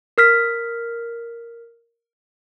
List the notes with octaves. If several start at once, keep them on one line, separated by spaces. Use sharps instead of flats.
A#4 F6 B6